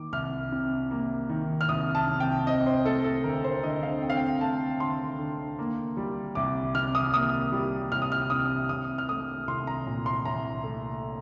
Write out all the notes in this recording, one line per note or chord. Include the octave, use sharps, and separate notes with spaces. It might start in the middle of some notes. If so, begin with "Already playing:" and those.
Already playing: D#3 A#3 D6
C2 F6
C3
A#3
D#3
F6
C2 D#6
A5
C3
G5
C4 D#5
C5
A3 A4
A4
D2 A#4
C5
D3 D#5
F5
C4 G5
F5
G5
A3 A5
D2 C6
D3
A#3
G3
C2 D6
C3 F6
D#6
A#3 D#6
G3
C2 F6
D#6
F6
C3 D#6
C2 D#6
F6
A3 D#6
C2 C6
A#5
A#2
C6
C2 A#5
A3